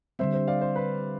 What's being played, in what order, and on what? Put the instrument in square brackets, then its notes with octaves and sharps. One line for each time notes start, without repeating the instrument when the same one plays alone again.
[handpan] D3 G3 C4 [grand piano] C5 E5
[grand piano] C5
D5 F5
C5
B4